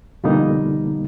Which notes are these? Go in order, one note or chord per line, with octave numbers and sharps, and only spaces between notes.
F2 B2 D3 G3 A#3 D#4